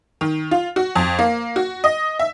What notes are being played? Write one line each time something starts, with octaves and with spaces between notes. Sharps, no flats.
D#3
F4
F#4
F2
A#3
F#4
D#5
E5